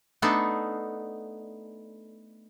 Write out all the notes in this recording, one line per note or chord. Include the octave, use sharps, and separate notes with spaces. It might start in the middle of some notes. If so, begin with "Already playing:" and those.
A3 B3 D4 D#4 A4